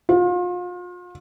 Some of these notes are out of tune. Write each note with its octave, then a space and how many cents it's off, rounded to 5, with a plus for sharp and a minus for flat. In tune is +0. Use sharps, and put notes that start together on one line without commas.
F4 +35